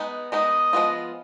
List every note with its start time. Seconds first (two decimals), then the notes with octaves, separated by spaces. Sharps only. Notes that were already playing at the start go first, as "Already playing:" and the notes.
Already playing: G#3 B3 D#4
0.32 G#3 B3 D#4 D#5
0.73 F3 G#3 B3 F4